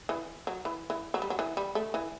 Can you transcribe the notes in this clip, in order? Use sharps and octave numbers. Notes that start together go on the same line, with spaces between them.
E3
F#3
E3
E3
F#3
G3
F#3
E3
G3
A3
E3